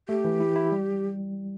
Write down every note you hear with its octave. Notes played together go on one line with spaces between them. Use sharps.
A3 G4
E3
E4
E4
G3